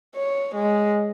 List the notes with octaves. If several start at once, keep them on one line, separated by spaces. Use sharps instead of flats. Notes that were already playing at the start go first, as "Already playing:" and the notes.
C#5
G#3